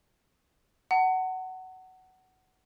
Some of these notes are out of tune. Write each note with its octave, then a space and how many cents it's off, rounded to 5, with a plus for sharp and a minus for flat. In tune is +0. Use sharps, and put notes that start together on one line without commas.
F#5 +15 A5 +45